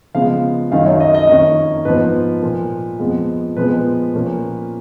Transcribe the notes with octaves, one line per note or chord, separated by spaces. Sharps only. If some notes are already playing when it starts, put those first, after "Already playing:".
C#3 F3 G#3 B3 F5
F#2 D#3 F#3 F5
C#5
D#5
D#5
F2 D#3 A#3 C#4
G#2 F3 B3 B4
A#2 F3 A#3
F2 F3 G#3 B3
A#2 F3 G#3 B3 B4
A#2 F3 A#3 C#4